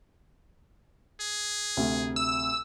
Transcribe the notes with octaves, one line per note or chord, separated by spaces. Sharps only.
G#4
D2 C3
E6